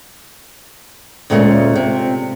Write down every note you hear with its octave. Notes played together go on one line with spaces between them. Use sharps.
D2 A#2 G#3 A3 B3 C#4
C3